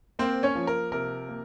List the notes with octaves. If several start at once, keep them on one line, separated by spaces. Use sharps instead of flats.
A#3 C4 C5
C#4 C#5
F3
A#4
C3 A#4
A#3